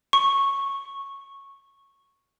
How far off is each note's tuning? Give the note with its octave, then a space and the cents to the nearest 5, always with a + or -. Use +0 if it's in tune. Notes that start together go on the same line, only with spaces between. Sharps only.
C#6 -10